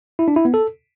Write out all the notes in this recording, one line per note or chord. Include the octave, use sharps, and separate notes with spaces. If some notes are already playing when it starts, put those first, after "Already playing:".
E4
D4
E4
B3
A4